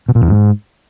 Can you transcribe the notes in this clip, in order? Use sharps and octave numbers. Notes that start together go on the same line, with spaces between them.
B2
A#2
E2
G#2